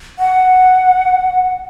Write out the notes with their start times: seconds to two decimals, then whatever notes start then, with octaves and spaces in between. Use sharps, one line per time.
0.19 F#5